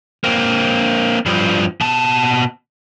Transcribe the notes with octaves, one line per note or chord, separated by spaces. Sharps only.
A#3 C4
G2 F3
B2 A5